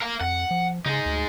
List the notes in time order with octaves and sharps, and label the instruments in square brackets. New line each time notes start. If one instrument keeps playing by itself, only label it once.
[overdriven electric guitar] A#4 F5
[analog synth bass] F2 [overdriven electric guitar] F#5
[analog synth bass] F3
[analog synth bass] C#3 [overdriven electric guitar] D#4 G#4
[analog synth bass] D2